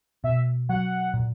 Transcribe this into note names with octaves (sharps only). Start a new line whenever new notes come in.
B2 E5
F#3 F#5
A#2